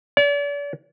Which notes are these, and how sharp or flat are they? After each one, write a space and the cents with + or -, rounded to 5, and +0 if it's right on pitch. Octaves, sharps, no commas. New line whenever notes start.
D5 -40